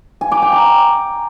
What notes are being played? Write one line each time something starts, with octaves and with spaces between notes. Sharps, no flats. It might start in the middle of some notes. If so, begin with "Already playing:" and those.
G#5
D6
G5
A#5